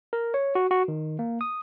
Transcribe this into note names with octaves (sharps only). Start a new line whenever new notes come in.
A#4
C#5
F#4
F#4
D#3
A#3
D#6